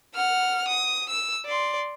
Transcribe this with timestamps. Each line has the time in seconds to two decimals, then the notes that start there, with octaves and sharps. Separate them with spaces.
0.15 F#5 F6
0.68 D#6
1.09 E6
1.46 D5 C6